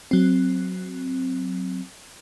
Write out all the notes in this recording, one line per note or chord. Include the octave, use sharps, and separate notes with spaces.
F#3 C4